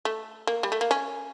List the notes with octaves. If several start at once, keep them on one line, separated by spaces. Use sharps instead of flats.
A3
A#3
G3
A3
A#3
C#4